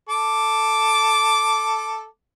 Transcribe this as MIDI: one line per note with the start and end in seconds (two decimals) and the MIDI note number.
0.09 2.06 69
0.09 2.06 86